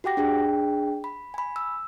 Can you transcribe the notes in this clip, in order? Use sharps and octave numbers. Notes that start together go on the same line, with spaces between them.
F#4 G4 F#5 G5 D6 A#6
D4 G#4 G5
B5
G#5 B5
E6